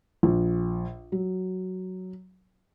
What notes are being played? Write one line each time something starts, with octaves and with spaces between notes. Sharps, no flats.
A#1
F#3